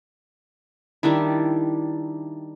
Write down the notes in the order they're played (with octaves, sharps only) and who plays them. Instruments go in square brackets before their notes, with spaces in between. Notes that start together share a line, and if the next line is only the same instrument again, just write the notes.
[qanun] D#3 G3 D4 E4